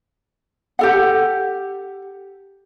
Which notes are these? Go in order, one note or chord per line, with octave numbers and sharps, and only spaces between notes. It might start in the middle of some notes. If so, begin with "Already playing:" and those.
G4 A4 F#5